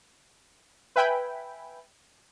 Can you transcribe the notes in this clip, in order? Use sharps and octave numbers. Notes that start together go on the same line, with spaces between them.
B4 E5 G5 G#5 B5